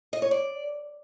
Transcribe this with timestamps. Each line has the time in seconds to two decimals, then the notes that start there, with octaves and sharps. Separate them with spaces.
0.13 D#5
0.22 C#5
0.31 D5